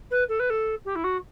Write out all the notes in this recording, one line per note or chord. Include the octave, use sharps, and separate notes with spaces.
B4
A4
B4
A4
G4
E4
F#4